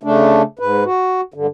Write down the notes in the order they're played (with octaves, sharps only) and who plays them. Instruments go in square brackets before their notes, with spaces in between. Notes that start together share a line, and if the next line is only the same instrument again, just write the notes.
[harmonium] C#3 A3 D4
G#2 B4
F#4
G2 D3